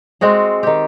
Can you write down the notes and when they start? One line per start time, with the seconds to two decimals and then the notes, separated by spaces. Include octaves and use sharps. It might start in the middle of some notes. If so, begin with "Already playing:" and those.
0.21 G#3 C4 F#4 G#4
0.63 D#3 G4